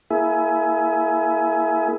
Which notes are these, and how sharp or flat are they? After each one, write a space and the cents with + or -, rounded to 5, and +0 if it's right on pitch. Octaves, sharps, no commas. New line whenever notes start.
A#3 +0 E4 +0 G#4 +25